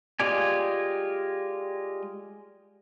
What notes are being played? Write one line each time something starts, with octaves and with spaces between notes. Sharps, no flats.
G#3 F4 G4 D5 G#5